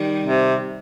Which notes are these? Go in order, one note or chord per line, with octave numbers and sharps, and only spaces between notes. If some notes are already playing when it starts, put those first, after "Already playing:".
Already playing: D#3 G3
C3